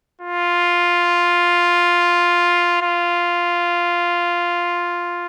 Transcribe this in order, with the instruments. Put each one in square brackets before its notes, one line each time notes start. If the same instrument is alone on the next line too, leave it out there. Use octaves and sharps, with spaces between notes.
[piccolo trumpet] F4
F4